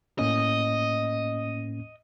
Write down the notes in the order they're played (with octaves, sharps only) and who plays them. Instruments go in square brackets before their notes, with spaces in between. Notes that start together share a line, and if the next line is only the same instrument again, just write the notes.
[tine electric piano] A2 A#3 C#4 [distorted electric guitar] D#5